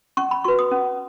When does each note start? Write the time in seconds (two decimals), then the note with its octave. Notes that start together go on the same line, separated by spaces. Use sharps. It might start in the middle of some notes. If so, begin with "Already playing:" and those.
0.17 C#4 C#6
0.31 B5
0.44 F#4 B4 C#6
0.59 D#6
0.71 C#4